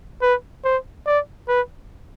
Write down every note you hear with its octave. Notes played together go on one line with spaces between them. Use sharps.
B4
C5
D5
B4